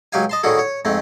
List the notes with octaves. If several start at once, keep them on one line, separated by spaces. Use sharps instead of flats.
C#2 F#3 G4 F5 G#5
D#5 A5 C6
A2 D3 D#3 A3 F#4 G#4
C#5
F2 G#2 A3 C4